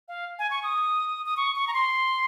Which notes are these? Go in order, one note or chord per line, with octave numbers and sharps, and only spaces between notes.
F5
G#5
C#6
D#6
D#6
C#6
C#6
A#5
C6